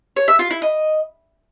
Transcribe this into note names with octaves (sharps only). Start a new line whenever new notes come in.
C#5
E5
F4
E4
D#5